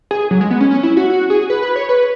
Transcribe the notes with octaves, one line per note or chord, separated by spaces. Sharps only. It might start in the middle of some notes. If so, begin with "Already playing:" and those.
G#4
F#3
G#3
B3
C#4
C#4
E4
F#4
F#4
G#4
B4
B4
C#5
B4